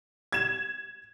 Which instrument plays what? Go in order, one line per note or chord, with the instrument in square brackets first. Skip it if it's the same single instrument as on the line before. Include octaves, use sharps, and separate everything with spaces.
[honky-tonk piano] G#6 E7